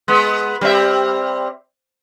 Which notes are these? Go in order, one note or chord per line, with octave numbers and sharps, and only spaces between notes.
G#3 B3
G3 C4 E5